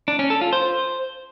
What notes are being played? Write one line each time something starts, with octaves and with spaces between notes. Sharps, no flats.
D4
C#4
A4
F4
C5